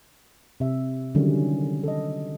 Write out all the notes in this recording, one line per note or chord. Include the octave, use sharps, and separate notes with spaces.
C3 E5
D3 D#3 F#3 G3 C#4 E4
A4 D#5